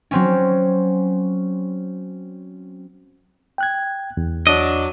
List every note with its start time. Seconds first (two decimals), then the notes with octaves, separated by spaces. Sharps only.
0.11 F#3 C4 C#4
3.58 G5 F#6 G#6
4.17 E2
4.47 F#3 D4 D#5